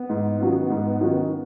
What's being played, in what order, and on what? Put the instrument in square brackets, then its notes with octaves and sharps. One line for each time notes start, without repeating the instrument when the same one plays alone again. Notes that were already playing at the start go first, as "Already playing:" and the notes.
Already playing: [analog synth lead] B3
[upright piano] G#2
D#3 F#3 C#4 F4
G#2
D#3 F#3 C#4 F4